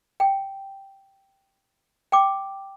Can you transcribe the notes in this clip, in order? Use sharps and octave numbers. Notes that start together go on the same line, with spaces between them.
G5
G5 D6